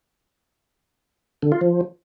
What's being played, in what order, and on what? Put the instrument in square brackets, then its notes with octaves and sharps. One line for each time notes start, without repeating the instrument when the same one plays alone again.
[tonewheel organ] D3
F4
F3